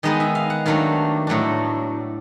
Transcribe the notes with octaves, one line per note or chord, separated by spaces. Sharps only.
D#3 G#3 B3 D#4 D#5
E5
F5
F#5
D#3 F#3 A3 D4 F5
A2 F#3 A3 D4